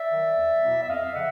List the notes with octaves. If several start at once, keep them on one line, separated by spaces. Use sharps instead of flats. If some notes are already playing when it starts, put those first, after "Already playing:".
Already playing: D5 E5
D#3 F#3
E2
B2 F#3 B3 E4
E5
F2 D#5 F5
C#3 F3 E5 F#5